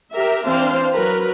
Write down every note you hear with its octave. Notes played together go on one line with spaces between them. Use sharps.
G4 A#4 E5
E3 C4 D4 C5 F5 C6
F#3 A#4 B4